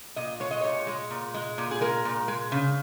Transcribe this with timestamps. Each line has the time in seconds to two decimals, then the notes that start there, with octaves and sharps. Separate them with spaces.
0.16 A#2 D#5
0.40 G#3 C#5
0.51 D#5
0.61 A#2 C#5
0.87 G#3
1.11 A#2
1.34 G#3
1.58 A#2
1.71 G#4
1.81 G#3 A#4
2.05 A#2
2.28 G#3
2.52 C#3